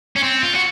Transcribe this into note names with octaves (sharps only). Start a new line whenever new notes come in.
C#4
C4
F4
F#4